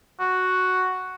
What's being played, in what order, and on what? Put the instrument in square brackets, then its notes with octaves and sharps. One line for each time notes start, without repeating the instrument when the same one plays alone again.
[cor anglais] F#4